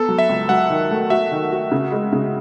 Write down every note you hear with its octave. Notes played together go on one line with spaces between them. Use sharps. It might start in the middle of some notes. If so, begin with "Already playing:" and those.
Already playing: B3 A4
F#3
E5
C#2
F#3 F#5
D#3
A3
F#4 E5
D#3
F#4
C#3
G#3
C#3